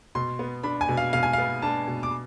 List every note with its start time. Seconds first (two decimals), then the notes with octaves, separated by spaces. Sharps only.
0.15 B2 C6
0.39 B3
0.63 D4 B5
0.81 G#5
0.89 B2
0.97 F5
1.13 B2 F5
1.23 G#5
1.33 B3 F5
1.62 D4 A5
1.87 B2
2.03 D6